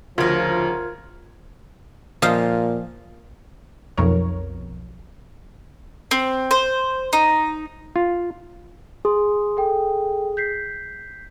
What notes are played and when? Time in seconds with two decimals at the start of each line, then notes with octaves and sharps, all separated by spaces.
0.18 D2 C#3 F3 D#4 F4 A#4 G#6
2.22 A#2 F3 D#5 F5
3.98 B1 F2 A#4 C#5
6.11 C4
6.51 C5
7.13 D#4
7.96 F4
9.05 G#4 C6
9.57 A4 G5
10.37 G6 B6 C7